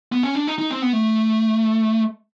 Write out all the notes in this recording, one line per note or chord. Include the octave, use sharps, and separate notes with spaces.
B3
C#4
D4
D#4
D#4
C4
B3
A3